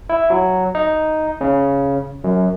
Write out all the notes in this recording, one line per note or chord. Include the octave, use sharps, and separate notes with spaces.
E4
F#3
D#4
C#3
F#2